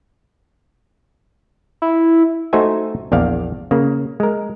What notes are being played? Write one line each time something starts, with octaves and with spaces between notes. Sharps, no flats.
E4
A3 D#4 F#4 C5 E5 G#5
A#1 E2 D5 F5
C#3 A#3
G#3 A#4